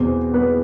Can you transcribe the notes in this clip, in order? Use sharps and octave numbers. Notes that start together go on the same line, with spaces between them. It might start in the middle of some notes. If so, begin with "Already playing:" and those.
Already playing: E2 B2 C4 C5
B3 B4